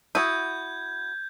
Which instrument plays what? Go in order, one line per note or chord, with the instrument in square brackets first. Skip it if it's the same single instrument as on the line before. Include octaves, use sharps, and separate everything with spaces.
[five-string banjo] E4 F#4 [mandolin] D#6 [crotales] G6 G#6